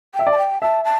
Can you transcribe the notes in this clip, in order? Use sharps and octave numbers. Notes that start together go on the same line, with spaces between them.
E5 G5
D5
A5
G5
E5 A5
A5